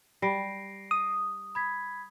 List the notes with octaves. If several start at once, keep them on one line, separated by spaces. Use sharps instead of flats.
G3 A#6 C7 D7
D#6
B5 G#6 B6